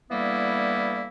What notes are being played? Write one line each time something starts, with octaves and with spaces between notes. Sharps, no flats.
D3 E3 G3 A#3 B3 E4